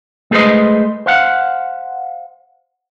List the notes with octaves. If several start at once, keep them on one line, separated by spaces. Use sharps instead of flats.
G#3 A3 G#4 B4 C5 D#5
C5 F5 F#5